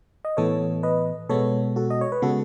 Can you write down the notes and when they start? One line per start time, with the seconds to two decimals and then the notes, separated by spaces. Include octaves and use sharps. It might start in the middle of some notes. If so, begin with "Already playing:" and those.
0.25 D#5
0.37 A2 E3 B3 A4 C#5
0.83 B4 D#5
1.29 B2 G#3 B3 A4 C#5
1.76 F#4 A4
1.90 D#5
2.01 C#5
2.12 B4
2.22 C#3 G#3 B3 F#4 A4